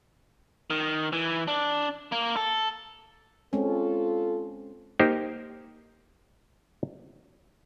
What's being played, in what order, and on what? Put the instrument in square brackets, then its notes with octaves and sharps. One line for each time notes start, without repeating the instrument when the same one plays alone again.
[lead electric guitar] D#3
E3
D4
A#3
A4
[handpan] G#3 C4 C#4 [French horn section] F4 A4
[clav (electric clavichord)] A#3 D#4 G4 A#4 C5